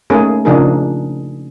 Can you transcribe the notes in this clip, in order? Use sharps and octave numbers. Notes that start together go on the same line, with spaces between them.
A3 A#3 C#4 D#4 G#4
C#3 F3 D4 D#4 G#4 A#4